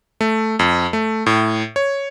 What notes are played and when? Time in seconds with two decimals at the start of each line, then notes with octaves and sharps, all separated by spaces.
0.21 A3
0.59 F2
0.93 A3
1.26 A2
1.76 C#5